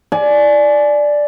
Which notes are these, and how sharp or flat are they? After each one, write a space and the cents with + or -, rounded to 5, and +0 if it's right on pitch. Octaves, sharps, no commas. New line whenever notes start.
D5 +0 G#5 +30